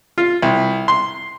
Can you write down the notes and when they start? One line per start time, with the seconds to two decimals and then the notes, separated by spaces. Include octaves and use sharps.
0.18 F4
0.42 C2
0.88 C6